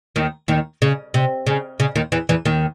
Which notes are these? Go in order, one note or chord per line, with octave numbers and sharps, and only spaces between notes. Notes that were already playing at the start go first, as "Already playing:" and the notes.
D#2 D#3
D#2 D#3
C#3
C3
C#3
C#3
D#2 D#3
E2 E3
E2 E3
D#2 D#3